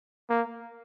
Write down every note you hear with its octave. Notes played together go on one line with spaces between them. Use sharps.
A#3